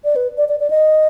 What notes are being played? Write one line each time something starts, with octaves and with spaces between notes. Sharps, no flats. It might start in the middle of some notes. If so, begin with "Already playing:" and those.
D5
B4
D5
D5
D5
D#5